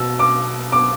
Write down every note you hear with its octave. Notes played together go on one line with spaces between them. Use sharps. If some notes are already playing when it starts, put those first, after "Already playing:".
Already playing: B2 E6
D6
D6